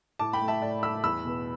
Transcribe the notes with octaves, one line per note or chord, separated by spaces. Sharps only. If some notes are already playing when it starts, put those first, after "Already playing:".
A2 A5 D6
G5 B5
A3
E5 A5
A2 D5
A3 B5 E6
E2 B5 E6
B2 B3